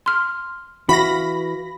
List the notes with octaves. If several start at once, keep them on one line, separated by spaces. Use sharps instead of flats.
C6 F6
E3 F#4 F5 B5 A#6